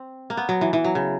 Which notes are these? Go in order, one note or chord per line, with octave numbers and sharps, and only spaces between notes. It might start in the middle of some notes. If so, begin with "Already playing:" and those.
Already playing: C4
A#3
B3
F#3
E3
E3
F#3
C#3